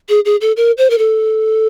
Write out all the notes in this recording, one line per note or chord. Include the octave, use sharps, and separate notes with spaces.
G#4
G#4
A4
A#4
C5
A#4
A4